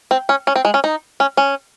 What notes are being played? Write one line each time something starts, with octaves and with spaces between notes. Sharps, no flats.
C4
C#4
C#4
C4
G#3
C#4
D#4
C#4
C#4